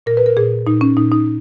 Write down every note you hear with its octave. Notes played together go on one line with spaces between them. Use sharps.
A#2 A#4
B4
A#4
A#2 G#4
A#2 D#4
C#4
A#2 D#4
D#4